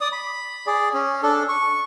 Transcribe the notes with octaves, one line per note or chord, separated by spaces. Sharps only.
D5 D#6
B5
G#4 D5
C#4
D4 A4
C#6